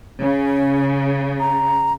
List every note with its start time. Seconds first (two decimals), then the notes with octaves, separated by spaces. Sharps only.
0.21 C#3 C#4
1.40 A#5